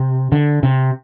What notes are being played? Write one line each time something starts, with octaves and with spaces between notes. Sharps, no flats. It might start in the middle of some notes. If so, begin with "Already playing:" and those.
Already playing: C3
D3
C3